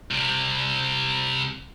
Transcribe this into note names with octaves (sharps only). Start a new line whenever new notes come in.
C2 C3